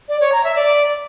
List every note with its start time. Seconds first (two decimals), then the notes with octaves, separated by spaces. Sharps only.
0.08 D5
0.20 C#5
0.32 A#5
0.44 E5
0.56 D5